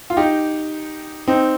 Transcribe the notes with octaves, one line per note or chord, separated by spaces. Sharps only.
F4
D#4 G4
C4 D#4